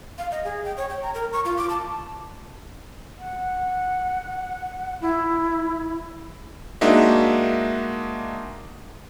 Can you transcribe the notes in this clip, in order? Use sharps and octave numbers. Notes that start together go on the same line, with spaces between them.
F5
D#5
G#4
G5
C#5
G5
A#5
A#4
C#6
F4
D6
A5
F#5
E4
G#3 A#3 D4 D#4 F#4 E5